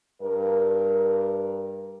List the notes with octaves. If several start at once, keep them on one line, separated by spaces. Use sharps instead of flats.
G2 A#4